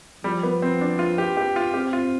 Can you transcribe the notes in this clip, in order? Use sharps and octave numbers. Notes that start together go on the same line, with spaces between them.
F3 G3
B3
C4
D4
F4
G4
G4
F4
C4 G4
F4